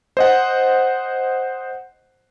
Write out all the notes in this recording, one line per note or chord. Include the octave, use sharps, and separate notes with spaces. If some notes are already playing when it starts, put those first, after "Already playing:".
C5 D#5 F#5